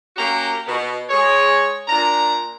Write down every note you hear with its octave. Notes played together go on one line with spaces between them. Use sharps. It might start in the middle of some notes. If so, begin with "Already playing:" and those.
A#3 C#4 F#4 G4 A#5
B2
G#3 G#4 C#5
A#2 D4 A#5